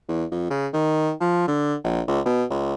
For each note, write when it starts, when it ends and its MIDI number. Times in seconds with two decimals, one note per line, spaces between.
0.09 0.25 40
0.31 0.46 41
0.50 0.68 49
0.73 1.12 51
1.21 1.43 53
1.47 1.75 50
1.84 2.01 34
2.08 2.20 37
2.26 2.44 47
2.50 2.74 37